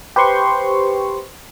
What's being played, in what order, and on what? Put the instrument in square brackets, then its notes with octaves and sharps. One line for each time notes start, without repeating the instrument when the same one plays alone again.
[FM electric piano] G4 B4 C5 C6 C#6